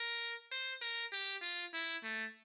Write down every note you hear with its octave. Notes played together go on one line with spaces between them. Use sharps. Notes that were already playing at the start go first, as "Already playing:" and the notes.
Already playing: A#4
C5
A#4
G4
F4
E4
A3